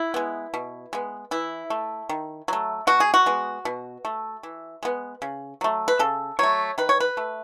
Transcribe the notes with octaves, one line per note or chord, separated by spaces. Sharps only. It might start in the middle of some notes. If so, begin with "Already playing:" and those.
Already playing: E4
G#3 B3
B2
G#3 B3
E3 E4
A3
D#3
F#3 A3
B2 F#4
G#4
F#4
G#3 B3
B2
A3
E3
G#3 B3
C#3
F#3 A3
B4
C#3 A4
F#3 A3 C#5
D#3 B4
C#5
B4
A3